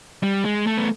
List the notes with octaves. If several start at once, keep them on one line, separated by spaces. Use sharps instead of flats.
G3
G#3
A3
B3